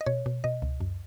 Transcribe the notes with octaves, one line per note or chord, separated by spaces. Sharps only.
D#5
B2 C#5
B2
B2 D#5
C#2
F#2